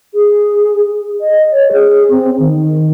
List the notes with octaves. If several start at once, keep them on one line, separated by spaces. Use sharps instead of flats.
G#4
D#5
C#5
G#4
C4
D#3